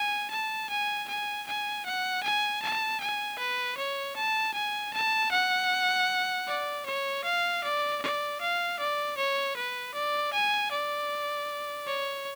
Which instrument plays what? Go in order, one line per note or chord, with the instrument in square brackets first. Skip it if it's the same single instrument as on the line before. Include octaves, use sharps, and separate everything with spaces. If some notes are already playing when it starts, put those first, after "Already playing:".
Already playing: [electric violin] G#5
A5
G#5
G#5
G#5
F#5
G#5
A5
G#5
B4
C#5
A5
G#5
A5
F#5
D5
C#5
F5
D5
D5
F5
D5
C#5
B4
D5
G#5
D5
C#5